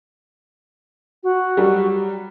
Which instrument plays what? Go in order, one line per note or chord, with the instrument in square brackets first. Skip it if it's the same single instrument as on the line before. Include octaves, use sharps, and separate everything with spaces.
[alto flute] F#4
[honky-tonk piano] F#3 G3